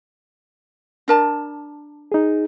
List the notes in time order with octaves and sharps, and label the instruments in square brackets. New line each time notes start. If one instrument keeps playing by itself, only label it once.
[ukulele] D4 A#4 A5
[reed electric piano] D#4 G#4